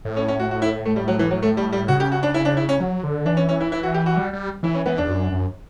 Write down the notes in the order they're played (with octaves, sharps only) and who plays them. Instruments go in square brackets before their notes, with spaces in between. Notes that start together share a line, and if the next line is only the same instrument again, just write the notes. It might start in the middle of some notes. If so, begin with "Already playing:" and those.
[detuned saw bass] A2
[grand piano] C#4
C#4
F#4
F#4
E4
A3
G3
F#3
E3
F#3
A3
G3
G3
[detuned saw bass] C#3 [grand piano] F#4
[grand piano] G4
F#4
D4
E4
D4
E4
C#4
[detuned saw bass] F#3
D3
[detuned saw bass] E3 [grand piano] D4
[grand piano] C#4
C#4
E4
E4
F#4
G4
F#4
[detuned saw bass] G3
G3
[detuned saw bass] E3 [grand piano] E4
[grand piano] C#4
[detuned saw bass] E3 [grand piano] B3
[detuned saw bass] E2 [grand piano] D4
[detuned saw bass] F#2
F#2